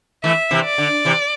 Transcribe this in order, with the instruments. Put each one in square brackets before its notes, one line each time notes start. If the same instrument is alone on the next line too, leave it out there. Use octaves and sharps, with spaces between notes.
[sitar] E3 A3 [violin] E5
[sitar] C3 E3
[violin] D5
[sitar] D3
C3 E3